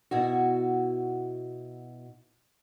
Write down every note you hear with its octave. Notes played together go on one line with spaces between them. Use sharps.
B2 E4 F#4